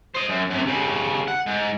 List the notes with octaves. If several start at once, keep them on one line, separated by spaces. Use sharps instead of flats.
C5 D#5
F#2
F#2 C3
D#2 C#3
F#5
G#2